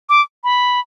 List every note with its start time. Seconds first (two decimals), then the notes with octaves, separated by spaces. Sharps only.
0.09 D6
0.44 B5